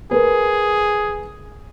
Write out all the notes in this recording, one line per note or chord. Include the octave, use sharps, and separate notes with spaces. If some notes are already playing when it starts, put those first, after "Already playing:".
G#4 A#4 B4